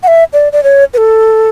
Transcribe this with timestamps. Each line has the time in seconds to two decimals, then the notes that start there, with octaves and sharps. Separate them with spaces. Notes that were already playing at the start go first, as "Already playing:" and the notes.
0.03 F#5
0.08 E5
0.33 D5
0.53 D5
0.63 C#5
0.94 B4
0.97 A4